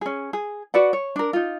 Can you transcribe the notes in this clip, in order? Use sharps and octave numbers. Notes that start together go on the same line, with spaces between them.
C#4 G#4
G#4
F#4 B4 D5 F#5
C#5
D4 A#4
D#4 F4